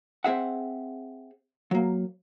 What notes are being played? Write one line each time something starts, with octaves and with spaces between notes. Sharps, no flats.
C4 G#4 E5 F#5
F#3 A#3